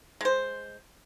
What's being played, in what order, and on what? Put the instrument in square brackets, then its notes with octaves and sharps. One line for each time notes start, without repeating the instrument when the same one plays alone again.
[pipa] G#3 C5